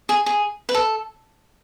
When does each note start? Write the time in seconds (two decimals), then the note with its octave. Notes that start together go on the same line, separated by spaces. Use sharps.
0.09 G#4
0.26 G#4
0.69 B4
0.75 A4